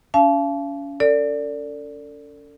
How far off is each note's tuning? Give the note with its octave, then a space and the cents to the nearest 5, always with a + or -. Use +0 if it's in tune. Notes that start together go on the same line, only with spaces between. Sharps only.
C#4 +35 F5 -35 A5 -35
A4 +35 D5 -10